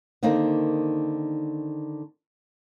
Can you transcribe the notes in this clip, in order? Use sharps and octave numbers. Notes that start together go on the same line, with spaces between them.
D3 D#3 A#3 C4 D#4